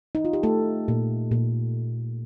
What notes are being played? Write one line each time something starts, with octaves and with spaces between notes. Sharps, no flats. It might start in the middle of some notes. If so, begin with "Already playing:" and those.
D#4
F4
G4
A3 A4
A#2
A#2